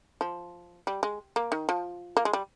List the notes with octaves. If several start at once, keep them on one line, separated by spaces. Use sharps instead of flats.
F3
G3
G#3
A#3
D#3
F3
A#3
G#3
G3